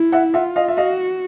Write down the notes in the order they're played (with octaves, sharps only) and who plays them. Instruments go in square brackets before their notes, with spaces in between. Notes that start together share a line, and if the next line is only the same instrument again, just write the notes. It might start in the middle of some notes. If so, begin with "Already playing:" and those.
Already playing: [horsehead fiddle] E4
[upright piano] E5 F#5
[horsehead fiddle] F4 [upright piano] E5 F#5
[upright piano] D#5 F5
E5
[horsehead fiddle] F#4 [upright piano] D#5 F5